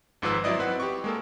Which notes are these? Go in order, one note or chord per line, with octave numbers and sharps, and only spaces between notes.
G#1 G#2 F3 B4 E6
F#3 C4 E4 D5 D#5
C4 B4 F#5
G4 C#6
G#3 A#3 A4